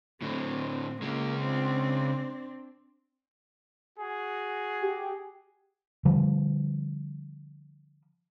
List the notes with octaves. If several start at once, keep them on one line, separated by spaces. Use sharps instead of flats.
A2 D3 C4
C#3 G#3 A#3
C4 D4
F#4 G#4
G4
D3 F3 G3